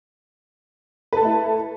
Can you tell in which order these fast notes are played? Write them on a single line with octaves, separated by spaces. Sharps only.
B4 A4 A3 E4